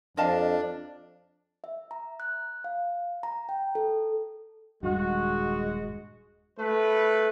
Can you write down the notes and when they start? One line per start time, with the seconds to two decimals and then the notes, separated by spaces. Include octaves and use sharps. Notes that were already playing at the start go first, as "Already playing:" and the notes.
0.17 F2 D4 D#5 F5 A5
1.64 E5
1.91 A#5
2.20 F#6
2.64 F5
3.23 A#5
3.49 G5
3.75 A4
4.83 D#1 G2 G#3 F#4
6.59 A3 B4